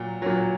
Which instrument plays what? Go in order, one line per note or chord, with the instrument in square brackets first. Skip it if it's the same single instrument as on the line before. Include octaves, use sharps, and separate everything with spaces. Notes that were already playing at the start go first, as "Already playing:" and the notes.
Already playing: [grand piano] A#2 F#3
A#2 F#3